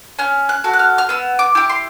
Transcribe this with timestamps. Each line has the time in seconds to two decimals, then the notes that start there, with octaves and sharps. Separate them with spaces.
0.19 C#4 F6
0.49 F#6
0.64 F#4 A4
0.73 F#6
0.79 F6
0.98 F6
1.09 B3 E6
1.39 D6
1.55 E4 G4
1.69 C6